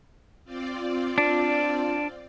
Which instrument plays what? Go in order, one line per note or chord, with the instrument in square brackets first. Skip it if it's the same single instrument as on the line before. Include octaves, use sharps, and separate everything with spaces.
[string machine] C4 F4 D5
[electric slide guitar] D4